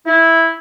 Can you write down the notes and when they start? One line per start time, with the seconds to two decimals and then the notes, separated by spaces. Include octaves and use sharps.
0.06 E4